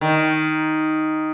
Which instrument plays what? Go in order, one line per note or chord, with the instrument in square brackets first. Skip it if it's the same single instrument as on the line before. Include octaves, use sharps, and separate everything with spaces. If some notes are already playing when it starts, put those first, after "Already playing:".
[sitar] D#3